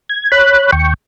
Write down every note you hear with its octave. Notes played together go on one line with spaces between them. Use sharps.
G#6
C#5 B5 F#6
D#2 G5 C#6